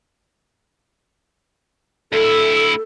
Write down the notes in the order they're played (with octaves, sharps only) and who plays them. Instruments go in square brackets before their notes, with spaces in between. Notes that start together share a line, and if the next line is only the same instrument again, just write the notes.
[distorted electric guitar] D2 E4 [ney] A4